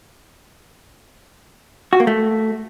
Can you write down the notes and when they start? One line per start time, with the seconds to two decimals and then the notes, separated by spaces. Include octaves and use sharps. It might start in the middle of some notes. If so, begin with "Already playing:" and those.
1.93 F#4
2.00 A#3
2.07 A3